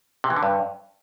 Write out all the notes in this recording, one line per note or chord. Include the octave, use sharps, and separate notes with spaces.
C3
E3
D3
G2